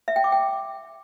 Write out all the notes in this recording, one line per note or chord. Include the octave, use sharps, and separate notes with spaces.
E5
G5
D6
G5